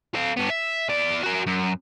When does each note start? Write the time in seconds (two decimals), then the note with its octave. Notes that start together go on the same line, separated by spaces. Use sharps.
0.14 A4 F5
0.37 G2 B3
0.50 E5
0.89 E2 D5
1.23 F#4 A#4
1.46 F#2